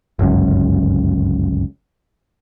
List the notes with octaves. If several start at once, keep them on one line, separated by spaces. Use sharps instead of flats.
G1 C#2 F#2